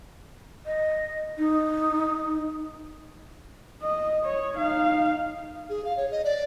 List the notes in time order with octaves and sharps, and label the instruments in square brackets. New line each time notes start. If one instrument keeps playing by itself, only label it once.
[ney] D#5
D#4
[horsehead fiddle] D#5
C#5
D#4 F5
[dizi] G#4
F5
C#5
D#5
D5